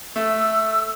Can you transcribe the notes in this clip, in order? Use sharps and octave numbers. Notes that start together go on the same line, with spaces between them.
A3 E6